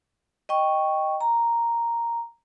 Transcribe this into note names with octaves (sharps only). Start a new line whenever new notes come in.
D#5 G5 C#6
A#5